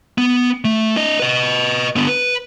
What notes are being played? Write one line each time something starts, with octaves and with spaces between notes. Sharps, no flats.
B3
A3
D4 D#5
B4 D#5
D3 B3
B4